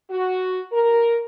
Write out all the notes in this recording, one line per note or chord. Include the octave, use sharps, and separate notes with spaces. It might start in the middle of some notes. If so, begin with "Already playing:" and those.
F#4
A#4